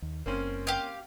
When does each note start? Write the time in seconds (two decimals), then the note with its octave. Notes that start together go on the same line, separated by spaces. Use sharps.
0.02 D#2
0.26 F#1 A#3 C4 C#4
0.67 G4 F5